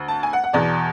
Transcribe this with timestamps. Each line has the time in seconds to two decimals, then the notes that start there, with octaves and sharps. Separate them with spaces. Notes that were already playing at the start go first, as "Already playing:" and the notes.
Already playing: D2
0.08 A5
0.23 G#5
0.33 F#5
0.44 F#5
0.53 E2 B2 D5